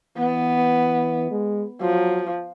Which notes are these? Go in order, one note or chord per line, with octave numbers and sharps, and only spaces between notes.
E3 B3
G#3
F3 F#3